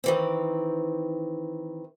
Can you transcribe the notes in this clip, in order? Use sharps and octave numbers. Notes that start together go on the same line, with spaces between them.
D#3 E3 C4